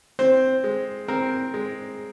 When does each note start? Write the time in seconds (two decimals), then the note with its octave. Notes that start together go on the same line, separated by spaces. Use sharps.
0.19 C4 C5
0.64 G#3
1.08 C4 A#4
1.54 G#3